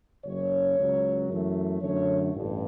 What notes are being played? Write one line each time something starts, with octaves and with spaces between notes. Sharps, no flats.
F#1 F#2 C#3 C#5
C#2 C#3 F#3
F#2 E3 A3
F#2 D3 A3 C#5
A1 G2